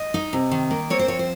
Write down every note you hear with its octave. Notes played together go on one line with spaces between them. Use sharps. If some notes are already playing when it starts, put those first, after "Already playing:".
Already playing: D#5
D#4
C3
D#3
A#3
C4 C#5
C5
F3 C#5
C5